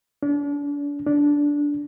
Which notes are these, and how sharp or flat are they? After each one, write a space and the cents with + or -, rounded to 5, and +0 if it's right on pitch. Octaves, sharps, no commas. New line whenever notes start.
D4 -35
D4 -10